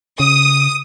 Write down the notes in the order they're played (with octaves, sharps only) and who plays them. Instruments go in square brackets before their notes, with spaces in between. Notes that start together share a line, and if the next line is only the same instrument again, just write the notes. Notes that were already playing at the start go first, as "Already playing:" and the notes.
[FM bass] C#3 [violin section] D#6